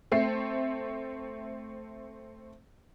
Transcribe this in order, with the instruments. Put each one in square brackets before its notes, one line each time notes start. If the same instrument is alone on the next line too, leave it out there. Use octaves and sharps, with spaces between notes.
[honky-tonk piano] A3 C4 C7